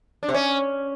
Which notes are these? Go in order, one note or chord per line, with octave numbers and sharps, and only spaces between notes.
D4
C3
C#4